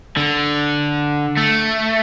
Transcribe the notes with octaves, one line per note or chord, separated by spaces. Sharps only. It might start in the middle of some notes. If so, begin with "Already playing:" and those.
D3
A3